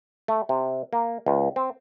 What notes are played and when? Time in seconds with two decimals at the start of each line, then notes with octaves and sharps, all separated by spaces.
0.28 A3
0.49 C3
0.93 A#3
1.26 C#2
1.56 C4